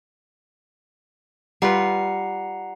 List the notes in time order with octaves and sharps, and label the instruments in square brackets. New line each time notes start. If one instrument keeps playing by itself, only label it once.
[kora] G3 F4 B4 [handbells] F#5 A#5 C7